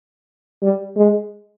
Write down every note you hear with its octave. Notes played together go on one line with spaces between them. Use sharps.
G3
G#3